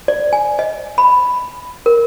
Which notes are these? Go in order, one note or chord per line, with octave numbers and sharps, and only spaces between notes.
D5
G#5
D#5
B5
A#4